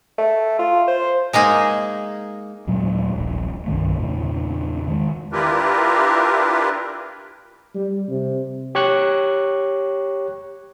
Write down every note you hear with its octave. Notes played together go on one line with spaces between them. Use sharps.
A3
F4
C5
G#3 A#3 D#4 G#4
D#2 A#2 F#3 G#3
D#1 A#1
C2 G2 D#3 A3
E2 A#2 C#3
D#3 G#3
D4 E4 F4 G4 A#4 B4
G3
C3
G4 C#5 C#6 F#6